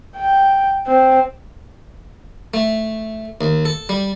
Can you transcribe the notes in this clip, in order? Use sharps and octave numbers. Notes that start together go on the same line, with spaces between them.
G5
C4
A3
D#2
A4
G3